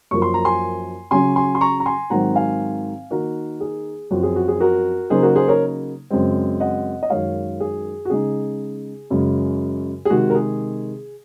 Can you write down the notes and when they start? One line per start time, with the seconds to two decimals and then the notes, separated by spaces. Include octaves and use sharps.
0.11 F#2 F3 A#3 C#6
0.22 C6
0.34 A#5
0.45 G#5 C6
1.11 C#3 F#3 C#4 G#5 C6
1.36 G#5 C6
1.55 C6
1.61 A#5 C#6
1.80 A#5
1.86 G#5 C6
2.10 G#2 D#3 F#3 C4 F#5 A#5
2.36 F5 G#5
3.11 D#3 A#3 D#4 F#4 A#4
3.60 G#4
4.11 F#2 F3 C4 F#4
4.23 G#4
4.36 F#4
4.48 G#4
4.60 F#4 A#4
5.10 C#3 F#3 A#3 D#4 G#4 C5
5.23 F#4 A#4
5.35 G#4 C5
5.48 A#4 C#5
6.10 F#2 C#3 G#3 C4
6.60 D#5 F#5
7.03 D#5
7.10 F#2 D#3 G#3 C#5 F5
7.60 G#4
8.05 F#4
8.10 C#3 G#3 D#4 G#4
9.10 F#2 C#3 G#3
10.05 G#4
10.10 C3 D#3 G#3 F#4
10.30 A#4
10.35 G#4